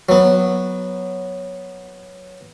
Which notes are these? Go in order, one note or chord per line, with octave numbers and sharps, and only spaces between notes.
F#3 B3